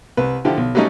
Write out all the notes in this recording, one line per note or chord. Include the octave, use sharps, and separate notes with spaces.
C2 B4
D3 F3 E4 G4
B1
F#3 G3 A3 C#4 D#4